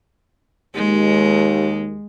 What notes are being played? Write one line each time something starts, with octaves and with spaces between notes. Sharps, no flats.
D#2 G#3